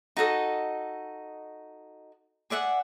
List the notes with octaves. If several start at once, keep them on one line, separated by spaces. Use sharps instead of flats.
D#4 F#4 A4 D#5
G#4 D5 E5 F#5